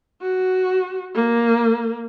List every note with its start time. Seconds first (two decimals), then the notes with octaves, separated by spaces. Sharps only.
0.22 F#4
1.15 A#3